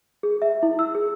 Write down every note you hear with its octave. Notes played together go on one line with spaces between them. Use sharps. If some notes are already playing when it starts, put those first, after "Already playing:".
G#4
E5
E4
E6
G#4